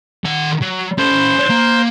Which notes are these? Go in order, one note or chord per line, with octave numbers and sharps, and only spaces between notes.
D#3 F#5
F#3
C#4 A4 C5
A#3